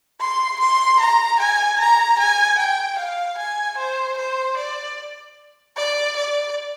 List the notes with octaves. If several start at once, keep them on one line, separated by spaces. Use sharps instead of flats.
C6
C6
A#5
G#5
A#5
G#5
G5
F5
G#5
C5
C5
D5
D5
D5